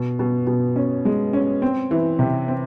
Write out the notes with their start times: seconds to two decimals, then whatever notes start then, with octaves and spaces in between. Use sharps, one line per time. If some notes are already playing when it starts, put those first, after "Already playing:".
Already playing: B2
0.19 B2
0.47 B2
0.76 C#4
1.05 G#3
1.33 C#4
1.62 C4
1.91 E3
2.19 C3
2.48 C4